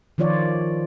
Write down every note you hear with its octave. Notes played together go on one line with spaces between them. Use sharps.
D#3 F3 F4 C#5 D5